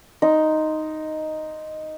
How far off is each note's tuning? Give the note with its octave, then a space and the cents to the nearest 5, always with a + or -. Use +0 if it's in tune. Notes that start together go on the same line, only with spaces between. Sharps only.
D#4 +0 C6 +0